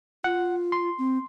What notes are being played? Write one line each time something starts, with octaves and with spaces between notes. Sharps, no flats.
F4 F#5
C6
C4